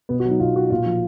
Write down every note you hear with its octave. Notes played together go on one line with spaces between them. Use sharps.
B2 B3
F#4
F#3
D#4
B2 F4
F#3 F#4
A#2 F4
F3